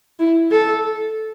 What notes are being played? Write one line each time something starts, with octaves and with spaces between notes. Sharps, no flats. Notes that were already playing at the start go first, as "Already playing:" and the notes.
E4
A4